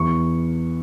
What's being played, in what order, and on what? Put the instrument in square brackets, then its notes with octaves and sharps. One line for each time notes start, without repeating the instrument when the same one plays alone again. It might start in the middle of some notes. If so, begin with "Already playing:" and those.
Already playing: [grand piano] E2 C#6